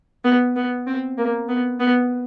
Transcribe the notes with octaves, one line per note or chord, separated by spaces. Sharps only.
B3
B3
C4
A#3
B3
B3